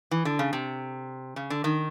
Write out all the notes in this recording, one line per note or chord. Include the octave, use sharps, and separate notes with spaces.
E3
D3
C#3
C3
C#3
D3
D#3